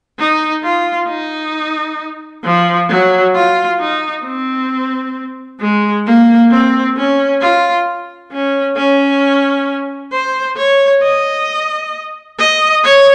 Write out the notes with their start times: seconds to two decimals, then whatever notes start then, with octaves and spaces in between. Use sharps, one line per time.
0.19 D#4
0.63 F4
1.08 D#4
2.44 F3
2.89 F#3
3.35 F4
3.79 D#4
4.25 C4
5.60 G#3
6.06 A#3
6.51 C4
6.96 C#4
7.41 F4
8.32 C#4
8.76 C#4
10.12 C5
10.57 C#5
11.02 D#5
12.38 D#5
12.84 C#5